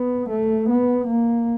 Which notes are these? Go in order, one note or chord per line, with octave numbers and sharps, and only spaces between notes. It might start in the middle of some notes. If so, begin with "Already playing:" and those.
Already playing: B3
A3
B3
A#3